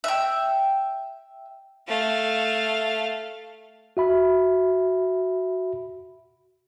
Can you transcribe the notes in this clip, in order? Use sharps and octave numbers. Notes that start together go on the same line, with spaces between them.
E5 G5
A3 F5
F#4 E5 B5